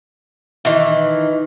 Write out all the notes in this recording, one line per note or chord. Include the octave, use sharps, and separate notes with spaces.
D#3 E3